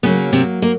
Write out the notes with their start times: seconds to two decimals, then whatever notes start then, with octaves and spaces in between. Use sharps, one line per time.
0.03 C#3 F#3 A#3 B3
0.33 C3 C4
0.62 A#3